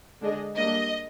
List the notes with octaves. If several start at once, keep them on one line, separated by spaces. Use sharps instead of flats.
D3 G#3 D4 G#4 D#5
G3 A#3 D4 D#5